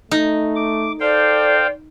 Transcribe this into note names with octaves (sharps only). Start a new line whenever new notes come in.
A3 D#4
D6
A4 C5 D5 F5 G5